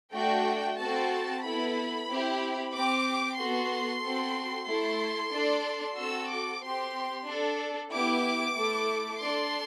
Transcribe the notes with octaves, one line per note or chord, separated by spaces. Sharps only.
A3 D4 F#4 G5
C4 F#4 A4 A5
B3 E4 A4 B5
C4 E4 G4
C4 G4 D6
B3 F#4 A4 C6
C4 F#4 A4
A3 E4 A4 C6
D4 A4
C4 F#4 A4 E6
D6
C4 G4 C6
D4 A4
B3 E4 G4 D6
A3 E4 A4
D4 A4 C6